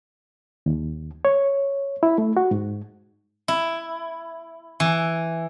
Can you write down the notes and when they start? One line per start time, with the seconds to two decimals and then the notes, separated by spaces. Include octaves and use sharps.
0.66 D#2
1.25 C#5
2.03 E4
2.18 A3
2.37 F#4
2.51 G#2
3.48 E4
4.80 E3